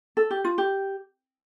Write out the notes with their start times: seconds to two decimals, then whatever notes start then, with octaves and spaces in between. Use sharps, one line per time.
0.17 A4
0.31 G4
0.44 F4
0.58 G4